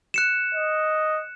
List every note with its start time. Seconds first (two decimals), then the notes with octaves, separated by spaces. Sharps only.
0.14 F#6 C#7 E7
0.55 D#5